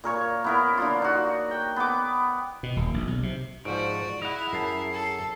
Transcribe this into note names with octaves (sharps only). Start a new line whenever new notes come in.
A#2 A#4 C#5 C#6
B3 E4 A#4
D3 A#3 F4
D#4 F#4
G5
B3 D6
B2
D#1
A#1
B1
C3
G#2 F3 F#4 D5 D7
E4 G#4 D#5 F#5 F7
F#2 A5 C7
A4